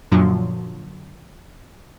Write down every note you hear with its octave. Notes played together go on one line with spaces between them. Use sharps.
F#2 A#2 D3 F3 F#3